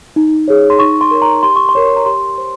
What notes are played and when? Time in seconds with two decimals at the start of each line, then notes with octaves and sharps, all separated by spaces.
0.16 D#4
0.48 G#4 C#5
0.70 C6
0.79 D#4 C#6
1.01 C6
1.11 A#4 C#5
1.22 A#5
1.43 G4 C6
1.56 C#6
1.69 C6
1.75 A#4 C#5
1.97 A#5
2.06 G4 C6
2.38 C5